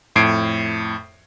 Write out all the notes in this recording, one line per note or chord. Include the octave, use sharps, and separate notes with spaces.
F2 A2 G#6 C7 D7